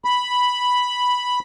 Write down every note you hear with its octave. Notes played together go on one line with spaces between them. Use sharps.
B5